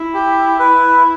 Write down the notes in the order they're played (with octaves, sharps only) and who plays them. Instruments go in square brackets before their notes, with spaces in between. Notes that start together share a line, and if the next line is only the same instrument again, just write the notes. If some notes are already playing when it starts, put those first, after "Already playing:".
Already playing: [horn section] E4
[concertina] G4
B4